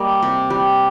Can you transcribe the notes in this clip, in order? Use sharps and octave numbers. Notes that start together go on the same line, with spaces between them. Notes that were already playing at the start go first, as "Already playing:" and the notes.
Already playing: G3 A#3 D#5
C3
G3